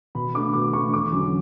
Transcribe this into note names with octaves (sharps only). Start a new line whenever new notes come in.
B2 B5
A3 D4 D6
B2 D6
A3 D4 C#6
E2 D6
D3 F#3 C#4